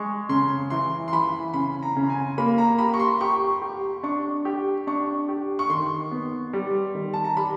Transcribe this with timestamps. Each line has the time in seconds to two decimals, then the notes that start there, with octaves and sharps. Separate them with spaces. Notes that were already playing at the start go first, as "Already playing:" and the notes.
Already playing: G#3 C#6
0.29 C#3 C6
0.70 E3 C6
1.08 C6
1.12 E3 B5
1.54 C#3 B5
1.83 A#5
1.96 C#3
2.10 G#5
2.38 A#3 B5
2.58 A#5
2.79 G4 B5
2.94 C#6
3.00 C6
3.21 G4 C#6
3.62 G4
4.03 D4 C#6
4.45 G4
4.87 D4 C#6
5.29 G4
5.59 C#6
5.70 D#3 C6
6.11 B3
6.53 G3
6.94 D#3
7.14 A5
7.24 A#5
7.36 G3 B5